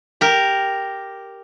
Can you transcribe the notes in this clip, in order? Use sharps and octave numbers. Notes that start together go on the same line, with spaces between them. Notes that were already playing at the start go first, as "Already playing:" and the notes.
G4 A#4